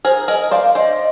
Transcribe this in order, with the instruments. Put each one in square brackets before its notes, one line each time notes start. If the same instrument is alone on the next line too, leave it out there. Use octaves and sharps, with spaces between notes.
[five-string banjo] G#4 A#4 [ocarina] C5
[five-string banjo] G#4 A#4 [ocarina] D#5
[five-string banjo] C5 D5 [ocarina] F5
[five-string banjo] C5 D5 [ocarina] D#5